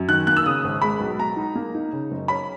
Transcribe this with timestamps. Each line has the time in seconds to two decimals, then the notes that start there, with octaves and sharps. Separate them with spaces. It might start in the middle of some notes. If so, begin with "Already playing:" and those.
Already playing: F#2
0.09 D#3 F#6
0.27 A#3 F#6
0.37 E6
0.46 C#3 D#6
0.64 G#1
0.82 G#3 B5
1.00 B1
1.19 G#3 A#5
1.37 D#4
1.55 A#3
1.75 D#4
1.93 C#3
2.11 F#1
2.28 C#4 B5